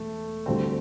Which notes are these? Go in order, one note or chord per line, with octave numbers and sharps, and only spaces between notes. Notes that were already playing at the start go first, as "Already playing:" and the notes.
Already playing: E1 A3
D2 D3 G3 C4 D4 A4